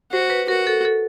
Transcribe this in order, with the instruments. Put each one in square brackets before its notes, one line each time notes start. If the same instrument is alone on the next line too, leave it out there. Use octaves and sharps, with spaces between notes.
[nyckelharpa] F#4 [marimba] C5
[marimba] B4
[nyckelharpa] F#4 [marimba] A#4
[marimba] A4
A4